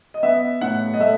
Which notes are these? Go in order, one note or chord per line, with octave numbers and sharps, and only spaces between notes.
D#5
B3 E5
A2 F#5
D#5
A3 E5